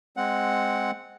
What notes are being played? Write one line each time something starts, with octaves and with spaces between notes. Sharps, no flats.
G#3 C4 F#5